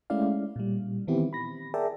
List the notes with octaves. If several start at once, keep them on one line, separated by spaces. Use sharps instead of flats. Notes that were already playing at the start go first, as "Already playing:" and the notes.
G#3 A3 C#4 E4 D5 F5
A#2 G3
D#3 E3 B3 C4 E4 G4
B5 A#6
G#4 A#4 D5 E5 G5 A5